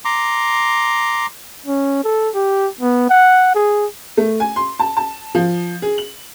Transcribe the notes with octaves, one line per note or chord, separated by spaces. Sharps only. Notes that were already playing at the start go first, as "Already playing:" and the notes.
A#5 C6 D6
C#4
A4
G4
B3
F#5
G#4
A3
G#5
C6
A5
A5
F3
G#4
F#7